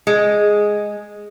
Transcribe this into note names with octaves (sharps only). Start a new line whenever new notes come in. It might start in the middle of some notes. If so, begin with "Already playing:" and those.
G#3